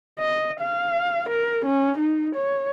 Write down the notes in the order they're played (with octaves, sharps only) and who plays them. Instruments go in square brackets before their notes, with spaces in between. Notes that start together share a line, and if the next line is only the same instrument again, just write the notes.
[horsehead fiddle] D#5
F5
A#4
C#4
D#4
C#5